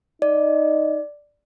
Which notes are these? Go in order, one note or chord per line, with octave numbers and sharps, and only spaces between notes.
D#4 D5